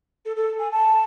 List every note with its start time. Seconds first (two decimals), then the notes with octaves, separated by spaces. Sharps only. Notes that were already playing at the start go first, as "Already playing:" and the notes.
0.25 A4
0.36 A4
0.59 G#5
0.72 A5